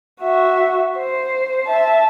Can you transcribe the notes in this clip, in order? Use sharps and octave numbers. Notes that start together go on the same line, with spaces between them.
F#4 E5
C5
E5 A5